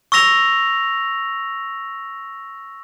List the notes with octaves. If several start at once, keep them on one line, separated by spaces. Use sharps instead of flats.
C#6 E6 A#6 F7